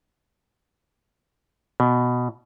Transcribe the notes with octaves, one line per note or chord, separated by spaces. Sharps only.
B2